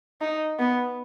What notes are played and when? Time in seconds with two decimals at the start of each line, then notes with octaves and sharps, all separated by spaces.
0.21 D#4
0.59 B3